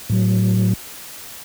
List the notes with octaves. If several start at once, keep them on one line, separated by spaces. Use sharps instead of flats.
A2 F#3